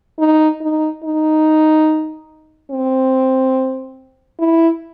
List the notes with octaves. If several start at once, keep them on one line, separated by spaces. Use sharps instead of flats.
D#4
D#4
D#4
C4
E4